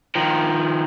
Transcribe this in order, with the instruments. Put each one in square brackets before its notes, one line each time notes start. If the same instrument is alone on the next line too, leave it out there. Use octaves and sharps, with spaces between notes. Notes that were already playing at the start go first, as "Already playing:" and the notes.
[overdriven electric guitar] D#3 F3